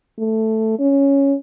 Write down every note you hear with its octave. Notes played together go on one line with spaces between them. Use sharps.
A3
C#4